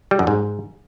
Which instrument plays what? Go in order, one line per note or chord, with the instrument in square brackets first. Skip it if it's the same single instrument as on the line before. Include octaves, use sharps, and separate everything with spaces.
[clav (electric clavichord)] G3
F#2
G#2